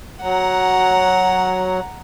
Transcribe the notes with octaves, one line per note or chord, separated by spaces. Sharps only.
F#3 F#5 A#5